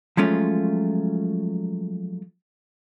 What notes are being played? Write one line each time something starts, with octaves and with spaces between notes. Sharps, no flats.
F3 F#3 G#3 A3 C#4 F4